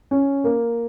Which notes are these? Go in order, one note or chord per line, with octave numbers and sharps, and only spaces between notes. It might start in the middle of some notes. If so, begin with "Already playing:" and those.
C#4
A#3